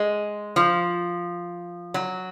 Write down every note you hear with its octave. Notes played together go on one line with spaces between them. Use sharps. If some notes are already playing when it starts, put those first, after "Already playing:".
Already playing: G#3
F3
F#3